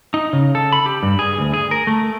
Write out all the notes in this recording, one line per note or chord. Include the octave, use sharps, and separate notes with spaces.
D#4
C#3
A4
B5
G4
G2
G#4
D2
G#4
A#4
A3